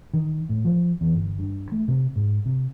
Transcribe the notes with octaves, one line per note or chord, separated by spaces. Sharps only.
D#3
A2
F3
E2
G1
G2
A3
C3
G#2
C3